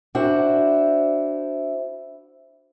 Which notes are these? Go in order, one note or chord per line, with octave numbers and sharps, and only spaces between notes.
D4 E4 F#4 C5